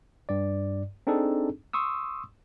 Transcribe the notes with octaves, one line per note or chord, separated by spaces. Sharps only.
G2 D5
C4 D4 D#4 G#4 A4
C6 C#6 D#6 E6